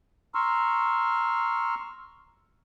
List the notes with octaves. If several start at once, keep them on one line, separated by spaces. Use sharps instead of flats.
A#5 C6 C#6 E6 F6